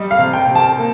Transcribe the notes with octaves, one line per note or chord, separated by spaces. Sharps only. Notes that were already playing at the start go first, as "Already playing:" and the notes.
Already playing: G3 D#5
F5
C3
G5
C3
A5
A#3